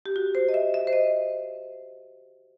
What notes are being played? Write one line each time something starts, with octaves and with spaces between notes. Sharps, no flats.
G4
F#4
C5
D#5
E5
E5
C5
D#5